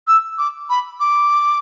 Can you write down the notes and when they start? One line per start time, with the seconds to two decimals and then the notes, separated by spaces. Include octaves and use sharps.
0.08 E6
0.38 D6
0.70 B5
1.00 D6